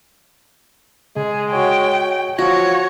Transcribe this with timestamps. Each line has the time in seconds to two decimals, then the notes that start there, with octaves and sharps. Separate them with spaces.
1.16 C#3 G#3 G#4
1.51 F#4 C#5 G5 G#5
2.39 F3 F#4 C#5 A#6